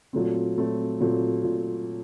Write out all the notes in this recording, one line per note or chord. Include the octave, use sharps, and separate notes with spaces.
A#2 F#3 A3 C4
A#2 F#3 A3 C4
A#2 F#3 A3 C4
A#2